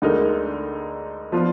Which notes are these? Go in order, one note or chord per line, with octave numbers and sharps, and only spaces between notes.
D2 D3 G#3 D#4 A#4
F3 B3 D4 F4